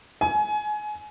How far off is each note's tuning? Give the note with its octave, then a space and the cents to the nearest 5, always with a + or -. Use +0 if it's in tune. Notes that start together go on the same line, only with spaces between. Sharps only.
G#5 +25